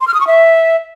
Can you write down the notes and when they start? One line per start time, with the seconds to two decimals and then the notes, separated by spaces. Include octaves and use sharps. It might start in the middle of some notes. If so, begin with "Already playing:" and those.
0.01 C6
0.07 F6
0.14 D#6
0.21 C#6
0.27 E5